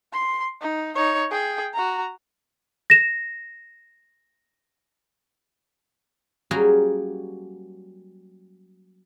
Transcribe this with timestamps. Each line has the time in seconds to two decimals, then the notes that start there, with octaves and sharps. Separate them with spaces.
0.12 C6
0.61 D#4
0.95 D#4 C#5
1.31 G#4 G5
1.73 F#4 A#5
2.90 A#6 E7
6.51 F#3 G3 A#3 C#4 F#4 G#4